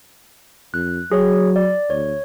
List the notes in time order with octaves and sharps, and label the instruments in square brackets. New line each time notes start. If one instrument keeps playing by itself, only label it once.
[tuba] F2 [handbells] F#6
[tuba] F#3 [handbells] G#4 C#5
[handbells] D5
[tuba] D2 [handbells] C#5